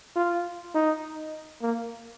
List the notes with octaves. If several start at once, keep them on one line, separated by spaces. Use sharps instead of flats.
F4
D#4
A#3